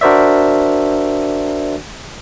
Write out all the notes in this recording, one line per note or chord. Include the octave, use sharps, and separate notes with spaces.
D4 F#4 A#4 C5 D5 E5